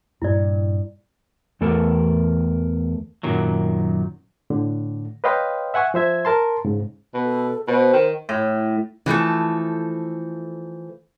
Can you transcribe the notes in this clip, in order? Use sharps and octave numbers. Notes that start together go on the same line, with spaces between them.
G2 A#2 E4 D5
E2 E3 A3 A4 A#4
F#2 A#2 D#3 F#3
A2 D3
B4 C#5 D#5 F5 G5 C6
E5 F#5 G#5 C#6
F3 C5 E5 G#6
A#4 A5 C6
G#2 C#3
B2
A4
B2 C5
D#3
A2
E3 F3 A3 A4